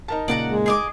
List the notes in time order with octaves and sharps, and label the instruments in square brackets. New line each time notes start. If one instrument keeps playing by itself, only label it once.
[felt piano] D#4 A#4 A5
[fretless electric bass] A#2 C#3 A#3 [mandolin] D5 F#5 A#5
[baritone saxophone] G#3
[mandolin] G#4 D#5 D6